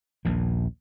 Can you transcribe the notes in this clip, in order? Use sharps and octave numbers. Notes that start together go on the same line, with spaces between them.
A#1 D#2 A#2